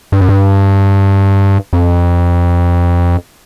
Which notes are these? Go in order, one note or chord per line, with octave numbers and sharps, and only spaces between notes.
G2
F#2
G2
F2